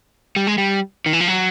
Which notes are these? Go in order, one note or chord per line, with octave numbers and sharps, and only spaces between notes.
G3
G#3
G3
D#3
E3
F3
F#3